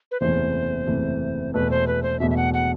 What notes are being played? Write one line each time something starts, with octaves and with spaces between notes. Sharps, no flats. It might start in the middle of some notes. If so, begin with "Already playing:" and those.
B4
F#1 E2 C3 E3 A3 C5
F#1 E2 C3 E3 A3
E1 E2 B2 A3 B4
C5
B4
C5
E1 E2 B2 A3 E5
E5
F#5
F#5